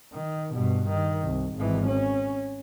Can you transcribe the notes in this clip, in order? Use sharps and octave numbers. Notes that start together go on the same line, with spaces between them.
D#3
G2 B2
D#3
C2
G#1 E3
C#4